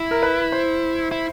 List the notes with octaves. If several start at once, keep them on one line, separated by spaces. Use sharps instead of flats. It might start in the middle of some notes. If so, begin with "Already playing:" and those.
Already playing: E4
A#4
B4
C5
E4